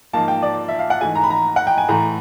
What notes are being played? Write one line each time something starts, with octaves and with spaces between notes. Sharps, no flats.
G#2 F3 A#3 A5
G5
D5
E5
F5
F#5
G#2 E3 A3 G#5
A#5
B5
A#5
F#5
G5
G#5
A2 E3 A3 A#5